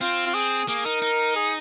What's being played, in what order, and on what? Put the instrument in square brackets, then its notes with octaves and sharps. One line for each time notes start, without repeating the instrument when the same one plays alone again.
[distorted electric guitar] C4 [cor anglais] F4
[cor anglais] F4
G#4
[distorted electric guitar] A#3 [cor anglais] G#4
[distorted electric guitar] D#4 [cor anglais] A#4
[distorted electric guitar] D#4
[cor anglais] G#4